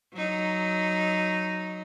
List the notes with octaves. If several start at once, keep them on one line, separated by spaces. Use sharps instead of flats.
F#3 D#4